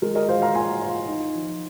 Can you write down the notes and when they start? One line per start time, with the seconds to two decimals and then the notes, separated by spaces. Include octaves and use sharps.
0.02 G#3 A#4
0.15 A#4 D#5
0.28 F4 C5 F5
0.42 F5 A#5
0.55 F4 G#5 C6
0.82 F4
1.08 D#4
1.34 F3